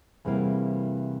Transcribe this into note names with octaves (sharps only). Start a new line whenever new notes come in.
E2 C3 E3 G3 A#3